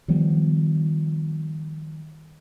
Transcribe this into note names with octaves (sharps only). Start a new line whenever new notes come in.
D#3 F3 G3 B3